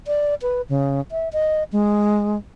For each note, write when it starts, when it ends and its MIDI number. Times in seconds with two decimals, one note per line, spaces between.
0.07 0.34 74
0.42 0.62 71
0.69 1.01 49
1.11 1.29 76
1.33 1.64 75
1.73 2.37 56